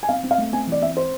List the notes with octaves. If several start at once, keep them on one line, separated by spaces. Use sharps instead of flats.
G#5
C4 F5
C4
F5
A3
C4 G#5
E3 D5
C4 E5
C5